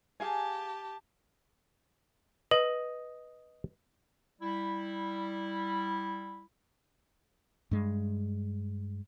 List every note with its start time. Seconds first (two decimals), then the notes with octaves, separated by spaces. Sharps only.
0.20 G4 G#4 F5 G#5 A5
2.51 B4 D#5
4.41 G3 E4
7.71 G2 G#3